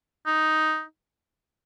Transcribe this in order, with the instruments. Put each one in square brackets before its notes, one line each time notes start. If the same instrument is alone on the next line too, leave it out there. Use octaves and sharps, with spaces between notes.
[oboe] D#4